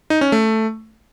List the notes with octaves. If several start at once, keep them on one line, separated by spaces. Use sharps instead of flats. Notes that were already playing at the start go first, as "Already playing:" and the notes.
D#4
C#4
A3